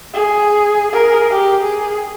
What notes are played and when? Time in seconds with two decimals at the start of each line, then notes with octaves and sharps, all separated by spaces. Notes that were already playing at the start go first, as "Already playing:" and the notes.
0.13 G#4
0.91 G#4 A#4
1.31 G4
1.63 G#4